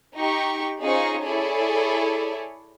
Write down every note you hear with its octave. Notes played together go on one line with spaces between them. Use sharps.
D#4 G4 C#6
C#4 D#4 F4 G#4 C5 C#6
E4 G#4 A4 C#5 D5